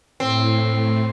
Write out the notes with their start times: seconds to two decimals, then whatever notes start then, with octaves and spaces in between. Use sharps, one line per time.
0.20 A2 C4